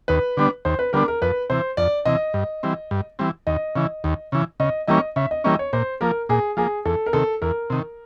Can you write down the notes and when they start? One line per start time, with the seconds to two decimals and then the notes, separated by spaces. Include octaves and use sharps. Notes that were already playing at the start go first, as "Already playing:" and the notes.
0.08 D#2 B4
0.37 D3 G3 B3 D4
0.65 D#2 C5
0.79 B4
0.93 D3 G3 B3 D4 A#4
1.08 A#4
1.22 F2 B4
1.50 C3 E3 C5
1.77 F2 D5
2.05 C3 E3 D#5
2.34 G2
2.63 E3 G3 C4
2.91 G2
3.19 E3 G3 C4
3.47 D#2 D#5
3.76 C#3 E3
4.04 D#2
4.32 C#3 E3
4.60 C#3 D#5
4.87 E3 G3 A#3 C#4 D#5
5.16 C#3 E5
5.31 D#5
5.44 E3 G3 A#3 C#4 D#5
5.59 C#5
5.73 A#2 C5
6.01 F3 A#3 A#4
6.29 A#2 G#4
6.57 F3 A#3 G#4
6.85 E2 A4
7.06 A#4
7.13 C3 D#3 A4
7.42 E2 A#4
7.70 C3 D#3